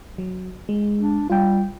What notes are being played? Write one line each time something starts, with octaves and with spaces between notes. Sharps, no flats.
F#3
G#3
D4
G3 F4 G5